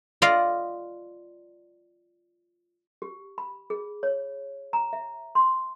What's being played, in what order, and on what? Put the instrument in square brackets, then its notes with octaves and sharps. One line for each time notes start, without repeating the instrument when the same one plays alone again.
[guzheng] F4 D5 D#5 F5
[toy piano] G4
B5
G#4
C#5
A#5
E5
C6